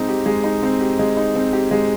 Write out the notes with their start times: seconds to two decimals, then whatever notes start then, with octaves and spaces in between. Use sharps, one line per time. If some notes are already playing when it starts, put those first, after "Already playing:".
Already playing: G#3 C4 D#4
0.09 G4
0.26 G#3
0.44 D#4
0.63 C4
0.81 G4
0.99 G#3
1.17 D#4
1.35 C4
1.53 G4
1.71 G#3